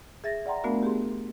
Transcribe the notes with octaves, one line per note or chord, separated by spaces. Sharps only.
G#4 E5 A6 A#6
D5 F#5 G5 A#5 C6
A3 B3 D4 F#4 A#4 F5
G4 G#4 C6